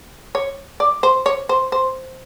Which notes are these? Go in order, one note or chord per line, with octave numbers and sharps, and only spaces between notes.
C#5
D5
C5
C#5
C5
C5